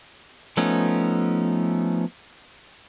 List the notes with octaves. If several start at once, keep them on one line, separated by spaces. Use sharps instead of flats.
F3 A3 B3 C#4 D#4